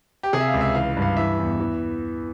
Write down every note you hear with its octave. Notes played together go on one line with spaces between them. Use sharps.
G4
C3 G#4
E5
F5
C#2
E5
E3 F5
G2
F5
E3 E5
E2
E3